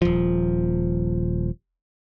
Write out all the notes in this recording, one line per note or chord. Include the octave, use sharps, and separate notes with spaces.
D#1 F3